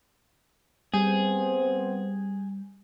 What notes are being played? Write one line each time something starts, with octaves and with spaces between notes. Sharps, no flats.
G3 B3 C4 G#4 C5